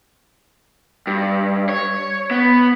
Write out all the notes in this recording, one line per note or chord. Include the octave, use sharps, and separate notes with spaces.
G2
C#5
B3